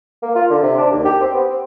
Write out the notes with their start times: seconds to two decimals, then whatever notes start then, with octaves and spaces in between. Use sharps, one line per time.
0.23 A#3
0.35 F4
0.50 D3
0.63 C3
0.78 D4
0.92 D#2
1.05 G4
1.21 C4
1.34 B3
1.50 C4